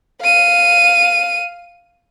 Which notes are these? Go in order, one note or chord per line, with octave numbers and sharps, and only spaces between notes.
F5 D#7